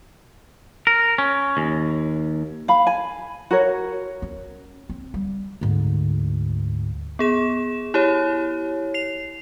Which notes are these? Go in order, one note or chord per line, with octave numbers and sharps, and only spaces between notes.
A#4
C#4
D#2
F5 B5
G#5
F#4 A#4 C#5
C#4
C4
G3
D2 G#2
B3 G#4 E7
E4 G4 C#5
C7 F7